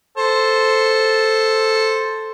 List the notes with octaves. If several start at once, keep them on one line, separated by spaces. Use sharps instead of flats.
A4 C5